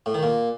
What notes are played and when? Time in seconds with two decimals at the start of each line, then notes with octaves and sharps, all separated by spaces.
0.06 A2
0.14 D#3
0.23 A#2